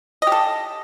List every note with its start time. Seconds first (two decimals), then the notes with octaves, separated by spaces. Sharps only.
0.22 D#5
0.27 G4
0.32 A4